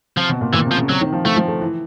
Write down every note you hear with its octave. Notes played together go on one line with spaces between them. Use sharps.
C3 F3
B2
A#2
A#2 E3
C3
F3
C#3
C3 F#3
D#3
F3
F3 A3
F3
A3
E3